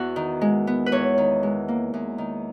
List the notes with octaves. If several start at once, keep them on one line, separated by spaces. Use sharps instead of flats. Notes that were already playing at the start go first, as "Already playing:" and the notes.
Already playing: E2 B3 F#4
D#3
G#3
B3
B4
E2 C#5
D#3
G#3
A#3
E2
D#3